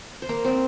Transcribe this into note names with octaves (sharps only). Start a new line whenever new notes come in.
C5
A#3 A#4
C4 C5